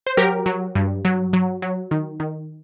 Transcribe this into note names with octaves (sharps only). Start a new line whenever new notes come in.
C5
F#3 G4 A#4
F#3
G2
F#3
F#3
F#3
D#3
D#3